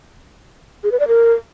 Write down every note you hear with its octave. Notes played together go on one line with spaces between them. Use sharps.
G#4
B4
D5
A#4